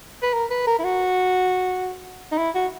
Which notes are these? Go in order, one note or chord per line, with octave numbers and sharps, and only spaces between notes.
B4
A#4
B4
A#4
E4
F#4
D#4
E4
F#4